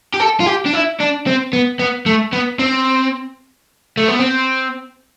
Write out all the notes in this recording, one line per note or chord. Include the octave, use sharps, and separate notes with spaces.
G4
A4
F4
G4
D4
E4
D4
C4
B3
B3
A3
B3
C4
A3
B3
C4